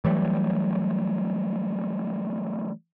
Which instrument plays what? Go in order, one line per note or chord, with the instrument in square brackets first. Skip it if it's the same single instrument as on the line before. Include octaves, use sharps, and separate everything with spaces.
[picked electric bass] E3 F#3 G3 A3